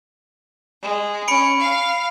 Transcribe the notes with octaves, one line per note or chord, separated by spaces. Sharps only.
G#3
C#4 B5 C#7 D7
F5